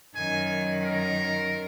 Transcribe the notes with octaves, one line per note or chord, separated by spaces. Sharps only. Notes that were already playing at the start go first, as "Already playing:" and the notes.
F#2 D#3 G#5
A#4